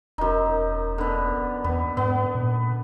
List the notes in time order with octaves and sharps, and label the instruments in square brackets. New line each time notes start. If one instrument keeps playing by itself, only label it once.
[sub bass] E1 [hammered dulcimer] F#2 D#4
[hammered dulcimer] D3 B3
[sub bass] E2 [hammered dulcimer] B3
[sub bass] G#2 [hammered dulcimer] B3
[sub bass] A#2